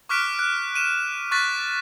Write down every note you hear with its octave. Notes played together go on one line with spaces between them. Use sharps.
C#6 D6 F6 F#6 B6 D7
F#6
D#7 E7
C#6 F#6 A6 B6